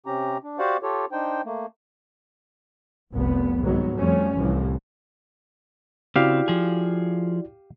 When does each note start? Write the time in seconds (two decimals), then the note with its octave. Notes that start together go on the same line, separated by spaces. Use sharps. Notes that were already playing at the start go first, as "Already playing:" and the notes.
0.06 C3 C4 C#4 G4 A#5
0.44 D4
0.59 F#4 G4 C5 D5 F5 F#5
0.83 F4 G4 A4 C#5
1.12 D4 D#4 C5 G5
1.45 A3 A#3
3.13 F1 C2 B3
3.62 C2 G#2 D#3 F#3 B3
3.95 F2 F3 G3 A3 C#4
4.37 C2 A2 E3 F3
6.16 C#3 C4 E4 F#4 G4 D5 F5
6.48 F3 G#4